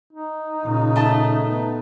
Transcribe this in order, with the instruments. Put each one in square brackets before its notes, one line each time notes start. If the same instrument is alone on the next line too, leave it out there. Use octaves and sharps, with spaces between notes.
[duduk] D#4
[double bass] A#2 C#3
[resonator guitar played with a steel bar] A3 A5
[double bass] B3